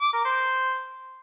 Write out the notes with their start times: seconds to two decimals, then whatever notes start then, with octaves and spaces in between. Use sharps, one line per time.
0.01 D6
0.13 A#4
0.25 C5